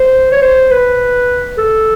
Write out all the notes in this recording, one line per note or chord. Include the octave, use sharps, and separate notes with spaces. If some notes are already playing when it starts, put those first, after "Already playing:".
Already playing: C5
C#5
C5
B4
A4